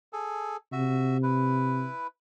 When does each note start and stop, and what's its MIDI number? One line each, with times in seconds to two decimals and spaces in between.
0.13 0.57 68
0.13 0.57 69
0.72 1.88 48
0.72 1.17 66
0.72 1.17 76
1.23 2.07 64
1.23 2.07 71